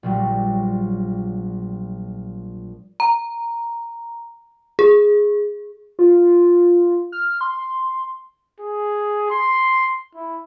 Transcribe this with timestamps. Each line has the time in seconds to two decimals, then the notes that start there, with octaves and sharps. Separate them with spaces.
0.03 A#1 F#3 G3
3.00 A#5
4.79 G#4
5.99 F4
7.12 F6
7.41 C6
8.60 G#4
9.31 C6
10.15 E4